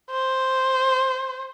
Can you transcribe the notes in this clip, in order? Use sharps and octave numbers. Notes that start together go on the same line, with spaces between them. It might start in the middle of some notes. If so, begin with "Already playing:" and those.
C5